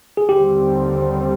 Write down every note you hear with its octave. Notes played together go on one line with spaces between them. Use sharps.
G#4
D#2 D3 G3 C4 G4